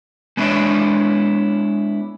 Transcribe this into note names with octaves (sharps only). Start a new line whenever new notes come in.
G#3 B3 D4 E4 C#5 D5